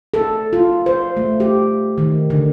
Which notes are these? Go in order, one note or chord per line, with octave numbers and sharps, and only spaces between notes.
A4
F4
C5
A3
G4
D#3
D3